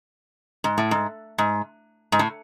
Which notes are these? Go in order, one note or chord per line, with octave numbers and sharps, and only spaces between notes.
G#2
A2
G#2
G#2
G#2
A2